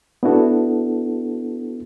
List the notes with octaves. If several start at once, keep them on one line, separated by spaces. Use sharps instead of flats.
B3 D4 E4 F#4 A4